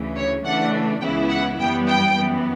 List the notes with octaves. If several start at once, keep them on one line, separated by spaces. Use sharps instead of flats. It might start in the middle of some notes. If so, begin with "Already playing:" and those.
Already playing: D2 C#3 E3
C#5
C#3 E3 A3 D4 F#5
C#2 C#3 E3 B3 E4 G5
F#5
F#2 E3 G3 B3 G5
G5
F#2 E3 B3